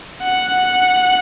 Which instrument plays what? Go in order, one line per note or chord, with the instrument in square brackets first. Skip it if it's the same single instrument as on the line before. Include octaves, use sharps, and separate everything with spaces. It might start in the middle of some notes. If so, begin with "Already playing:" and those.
[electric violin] F#5